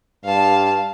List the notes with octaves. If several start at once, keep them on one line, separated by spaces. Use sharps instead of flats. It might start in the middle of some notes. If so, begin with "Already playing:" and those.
G2 F5 A5